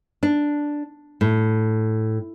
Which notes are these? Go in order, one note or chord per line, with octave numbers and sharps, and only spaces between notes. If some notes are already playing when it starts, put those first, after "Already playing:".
D4
A2